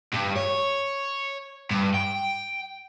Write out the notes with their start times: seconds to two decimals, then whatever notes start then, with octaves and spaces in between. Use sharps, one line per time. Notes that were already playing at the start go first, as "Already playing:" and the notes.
0.14 G2
0.36 C#5
1.71 G2
1.94 G5